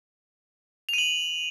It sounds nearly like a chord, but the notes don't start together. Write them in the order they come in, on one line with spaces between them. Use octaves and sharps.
F7 D#7 F#7